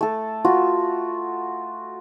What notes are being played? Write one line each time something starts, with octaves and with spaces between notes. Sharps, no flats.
A3 A4
F4 F#4